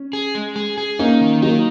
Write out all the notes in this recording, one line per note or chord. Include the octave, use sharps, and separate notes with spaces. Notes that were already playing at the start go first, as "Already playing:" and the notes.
Already playing: C#4
G#4
G#3
G#4
G#4
A#3 C#4 D#4
D#3
F#3 A#3 D#4